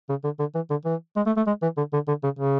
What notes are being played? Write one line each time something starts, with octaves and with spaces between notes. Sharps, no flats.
C#3
D3
D3
E3
D3
E3
G#3
A3
A3
G#3
E3
D3
D3
D3
C#3
C#3